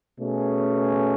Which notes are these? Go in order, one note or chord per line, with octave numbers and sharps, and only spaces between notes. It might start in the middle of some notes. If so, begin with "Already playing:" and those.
B2 A3 C#4 G#4